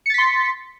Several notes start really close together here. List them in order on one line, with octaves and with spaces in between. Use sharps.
C#7 A6 B6 C6